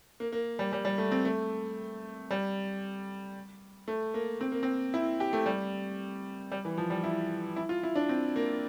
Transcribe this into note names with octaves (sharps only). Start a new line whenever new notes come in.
A#3
A#3
G3
G3
G3
A3
C4
A3
G3
A3
A#3
C4
A#3
C4
E4
G4
A3
G3
G3
E3
F3
G3
E4
E4
F4
E4
D4
C4
A#3